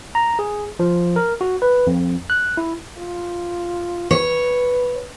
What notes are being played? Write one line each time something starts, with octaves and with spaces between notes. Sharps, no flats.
A#5
G#4
F3
A#4
F#4
B4
F2
F#6
E4
F4
B4 C#5